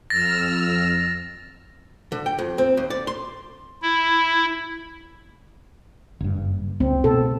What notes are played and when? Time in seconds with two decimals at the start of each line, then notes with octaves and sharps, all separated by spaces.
0.10 F2 E6 F6 A6 A#6
2.12 D3
2.26 G5
2.39 F2
2.58 C4
2.77 D#2
2.90 D5
3.07 C6
3.82 E4
6.21 F#1 G2
6.80 C#2 C4
7.04 B2 A4